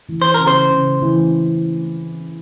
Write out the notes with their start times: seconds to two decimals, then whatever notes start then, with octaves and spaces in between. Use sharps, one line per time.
0.09 E3
0.22 C5
0.34 C#3 A#4
0.47 C5
0.70 C#3
1.02 E3